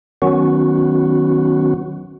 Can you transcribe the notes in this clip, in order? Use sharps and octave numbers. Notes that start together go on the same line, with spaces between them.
D#3 F#3 B3 C#4 F#4